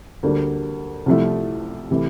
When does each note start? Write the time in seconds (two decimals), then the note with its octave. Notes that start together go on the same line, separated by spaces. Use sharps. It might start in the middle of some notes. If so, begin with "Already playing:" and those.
0.23 D2 D3 G3 A#3 D4
1.06 C2 C3 F3 A3 E4
1.91 C3 E3 A3 E4